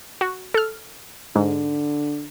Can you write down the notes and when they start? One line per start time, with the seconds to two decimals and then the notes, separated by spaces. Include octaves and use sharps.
0.21 F#4
0.54 A4 F6
1.35 G#2 D3